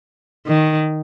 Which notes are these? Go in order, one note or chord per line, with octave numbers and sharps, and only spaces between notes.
D#3